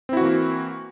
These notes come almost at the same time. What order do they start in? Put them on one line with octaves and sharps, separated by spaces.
C4 E4 F#4 E3 A#3